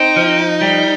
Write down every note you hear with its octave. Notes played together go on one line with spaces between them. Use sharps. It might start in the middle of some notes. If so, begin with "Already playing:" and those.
Already playing: C4 D#4
F3
G3